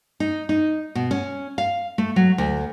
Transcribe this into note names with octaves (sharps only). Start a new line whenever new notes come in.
D#4
D#4
B2
C#4
F5
A3
F#3
D2